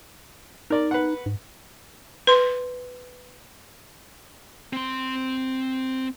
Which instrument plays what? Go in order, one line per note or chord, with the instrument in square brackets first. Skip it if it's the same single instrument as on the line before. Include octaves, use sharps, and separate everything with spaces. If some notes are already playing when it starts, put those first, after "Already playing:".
[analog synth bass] D#4 [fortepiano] A#4 D5
[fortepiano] B4 F#5
[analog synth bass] G#2
[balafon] B4 C6
[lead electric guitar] C4 C6